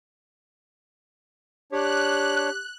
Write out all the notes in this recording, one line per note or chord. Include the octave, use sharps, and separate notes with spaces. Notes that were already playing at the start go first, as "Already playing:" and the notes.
D4 G4 C#5 F#6